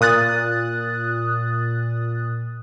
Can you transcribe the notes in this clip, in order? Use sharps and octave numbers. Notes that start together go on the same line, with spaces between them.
A#2 D#6 F#6 A6